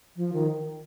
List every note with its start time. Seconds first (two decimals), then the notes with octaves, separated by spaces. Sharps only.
0.16 F3
0.33 D#3